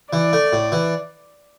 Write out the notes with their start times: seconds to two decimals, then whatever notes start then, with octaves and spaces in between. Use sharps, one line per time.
0.13 E3 D5
0.33 A3
0.53 A2
0.72 E3